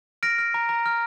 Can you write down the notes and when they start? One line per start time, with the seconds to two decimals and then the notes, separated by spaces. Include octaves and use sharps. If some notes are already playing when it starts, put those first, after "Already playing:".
0.23 F6 A#6 D7
0.38 F6
0.54 A#5
0.69 A#5
0.86 F6